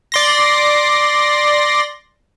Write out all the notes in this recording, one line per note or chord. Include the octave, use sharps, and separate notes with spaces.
D5 C6 A#6